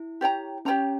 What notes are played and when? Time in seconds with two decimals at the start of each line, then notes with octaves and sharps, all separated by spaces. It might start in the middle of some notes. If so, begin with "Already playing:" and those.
Already playing: E4
0.21 G4 C#5 G5 A#5
0.65 C#4 G4 C#5 G5 A#5